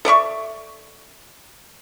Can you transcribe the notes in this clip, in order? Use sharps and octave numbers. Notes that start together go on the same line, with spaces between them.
A4 D5 E5 C#6